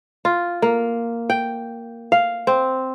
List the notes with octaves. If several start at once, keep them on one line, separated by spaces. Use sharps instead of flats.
F4
A#3
G5
F5
C4